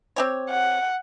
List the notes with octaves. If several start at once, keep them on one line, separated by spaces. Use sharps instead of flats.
C4 G4 C#5
F#5